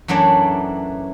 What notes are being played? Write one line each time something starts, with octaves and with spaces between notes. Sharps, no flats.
F#2 E3 F#3 A3 D4